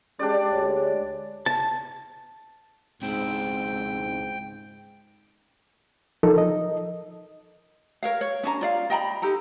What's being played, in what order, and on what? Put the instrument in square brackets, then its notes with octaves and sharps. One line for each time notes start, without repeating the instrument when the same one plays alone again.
[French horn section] G#3 C#4 [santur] D4 G4 D5
[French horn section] D2 G#3 C#5
[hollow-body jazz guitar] A5
[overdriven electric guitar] C#2 C4 [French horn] G#2 [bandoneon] G5
[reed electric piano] F3 D#4 A4 A#4
D#5
[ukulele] A#4 C#5 F5
C#5
C#4 D4 A#5
F4 D5 F5
D#5 G5 A#5 B5
D#4 G4 A4 A#5